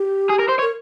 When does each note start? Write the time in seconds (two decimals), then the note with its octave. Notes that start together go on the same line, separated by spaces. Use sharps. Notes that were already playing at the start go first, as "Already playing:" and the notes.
Already playing: G4
0.29 G#4
0.39 A#4
0.48 C5
0.58 C#5
0.62 A#4